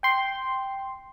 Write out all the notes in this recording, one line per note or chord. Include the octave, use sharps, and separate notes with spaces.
G5 C6